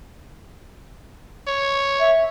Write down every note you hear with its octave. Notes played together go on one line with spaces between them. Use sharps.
C#5
E5